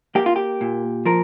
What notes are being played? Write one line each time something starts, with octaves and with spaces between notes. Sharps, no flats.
A#3 G4
F4
G4
A#2
F3 A#4